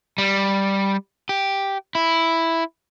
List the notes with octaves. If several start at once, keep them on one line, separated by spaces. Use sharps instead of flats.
G3
G4
E4